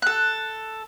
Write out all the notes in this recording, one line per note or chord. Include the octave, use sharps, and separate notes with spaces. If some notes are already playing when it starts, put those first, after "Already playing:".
A4 F#6